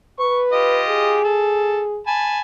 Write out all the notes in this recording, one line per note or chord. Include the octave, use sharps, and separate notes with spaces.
B4 C#6
F4 G4 D#5
G#4
A4
G#5 A5 B5